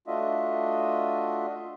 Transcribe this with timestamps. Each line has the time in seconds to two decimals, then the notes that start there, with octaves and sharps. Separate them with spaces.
0.07 A3 D4 F4 F#4 D#5 E5